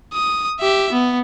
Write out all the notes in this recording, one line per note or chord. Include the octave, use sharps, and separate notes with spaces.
D#6
G4 E5
B3